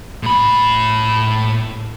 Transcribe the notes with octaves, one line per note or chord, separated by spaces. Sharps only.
A2 B5